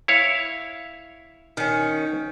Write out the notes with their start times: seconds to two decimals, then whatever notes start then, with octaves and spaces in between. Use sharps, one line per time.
0.08 E4 C#5 F5
1.57 D#3 C#4